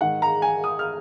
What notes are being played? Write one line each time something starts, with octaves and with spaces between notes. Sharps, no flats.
G#2 D#3 F#5
A#5
G#5
D#6
F6